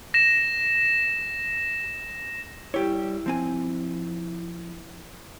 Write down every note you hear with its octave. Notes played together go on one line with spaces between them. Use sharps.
A#6 E7
G3 E4 G4 C#5
F3 C4 G#5